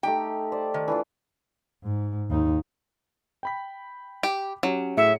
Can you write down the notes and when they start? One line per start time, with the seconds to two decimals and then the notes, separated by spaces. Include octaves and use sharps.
0.03 A3 D#4 G4 G5
0.52 C5 D5
0.74 D#3
0.88 E3 D4 F4
1.83 G#2
2.30 D#2 D#4
3.43 G5 B5 B6
4.23 G4
4.63 F#3 C#4 G4
4.97 A2 G#4 E5 C#7